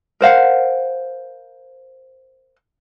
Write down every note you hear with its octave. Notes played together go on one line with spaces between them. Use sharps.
A#4 C5 F5 F#5